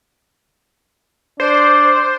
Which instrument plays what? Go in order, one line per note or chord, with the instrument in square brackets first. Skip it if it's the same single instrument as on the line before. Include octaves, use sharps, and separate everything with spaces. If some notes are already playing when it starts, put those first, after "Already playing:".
[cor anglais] D4 [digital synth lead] C5